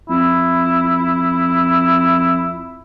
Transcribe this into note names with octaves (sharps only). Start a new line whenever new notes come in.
F2 E4